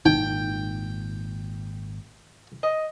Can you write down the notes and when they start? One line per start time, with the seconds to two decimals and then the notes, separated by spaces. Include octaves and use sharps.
0.06 G#1 A#2 D#4 G5
2.63 D#5